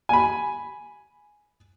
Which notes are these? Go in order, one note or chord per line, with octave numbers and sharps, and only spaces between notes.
G#5 B5